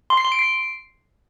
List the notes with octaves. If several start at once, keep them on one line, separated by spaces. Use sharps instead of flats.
C6
C7
C6
D7
C7